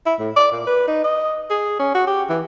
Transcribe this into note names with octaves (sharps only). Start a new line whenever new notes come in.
E4
A2
D5
A#2
B4
D#4
D#5
G#4
C#4
F#4
G4
E3